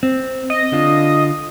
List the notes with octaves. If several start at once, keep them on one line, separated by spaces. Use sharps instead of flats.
C4
D#5
D3 D4 F4